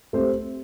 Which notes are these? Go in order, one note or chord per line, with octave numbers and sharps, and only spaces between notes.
A3 C4 G4 C5